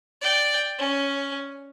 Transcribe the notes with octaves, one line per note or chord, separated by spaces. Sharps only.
D5 G5
C#4